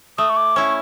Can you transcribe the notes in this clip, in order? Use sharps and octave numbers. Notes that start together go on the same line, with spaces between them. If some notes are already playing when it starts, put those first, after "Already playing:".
A3 D#6
C#6
D6
C#4 E4 C#6